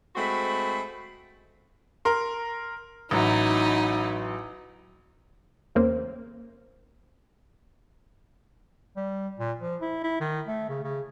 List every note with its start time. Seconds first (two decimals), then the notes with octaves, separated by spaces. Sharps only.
0.16 G#3 A3 C4 F#4 B5
2.05 A#4 C6
3.11 A1 F#3 D#4 E4
5.75 E2 C#3 A#3 C4
8.96 G3
9.39 A#2
9.61 F3
9.81 E4
10.03 E4
10.20 D#3
10.47 A3
10.69 C#3
10.84 C#3